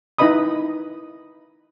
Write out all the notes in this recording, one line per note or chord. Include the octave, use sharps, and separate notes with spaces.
D#4 E4 B4 D#5 B5 D#6